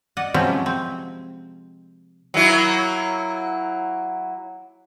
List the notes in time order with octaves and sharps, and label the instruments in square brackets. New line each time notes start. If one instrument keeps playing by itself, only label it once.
[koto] D5 D#5 F#5
C3 F3 F#3 G#3 C4 C#4
C4
[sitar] F#3 A#3 E4